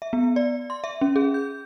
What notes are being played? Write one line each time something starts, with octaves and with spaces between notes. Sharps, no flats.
E5
B3
D5
C6
E5
C#4
G#4
G6